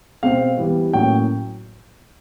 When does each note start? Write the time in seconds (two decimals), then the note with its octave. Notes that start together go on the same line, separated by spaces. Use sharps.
0.23 B2 G#3 C4 F5
0.57 E3 G3 B3
0.93 A2 F#3 A#3 C#4 G5